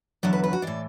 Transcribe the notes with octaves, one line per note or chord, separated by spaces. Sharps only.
E2 D3 F#3 D5
B4
B4
F#4
A2 E3 D5